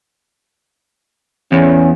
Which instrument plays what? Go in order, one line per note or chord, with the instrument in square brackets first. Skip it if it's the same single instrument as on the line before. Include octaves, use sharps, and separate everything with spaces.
[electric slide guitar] E2 [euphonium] C#4